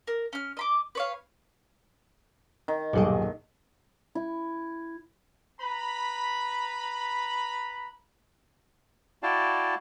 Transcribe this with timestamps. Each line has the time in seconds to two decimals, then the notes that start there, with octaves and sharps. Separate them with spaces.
0.07 A#4
0.33 C#4 F6
0.57 D#5 B5 D6
0.95 B4 C#5 F5
2.68 D#3
2.93 D#1 B1 G2 F#3 G3 G#4
4.15 E4
5.59 B4 A#5 B5
9.23 E4 F#4 D5 F5 G5 A5